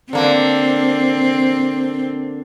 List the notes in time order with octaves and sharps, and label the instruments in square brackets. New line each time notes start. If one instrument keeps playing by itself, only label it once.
[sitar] D3 A#3 [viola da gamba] C4